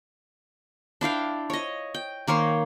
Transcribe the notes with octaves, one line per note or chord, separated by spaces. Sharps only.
D4 E4 F5 G5
C#5 D#5
G5
D#3 A#3 C#5 C6